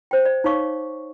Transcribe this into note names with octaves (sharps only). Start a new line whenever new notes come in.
C5 G5
D5
D#4 C#5 F5 C#6 D6